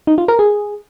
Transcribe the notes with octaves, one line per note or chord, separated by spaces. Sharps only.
D#4
F4
A#4
G#4